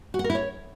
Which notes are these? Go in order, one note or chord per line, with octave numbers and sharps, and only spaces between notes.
F#4
F#5
A#4
E4
C#5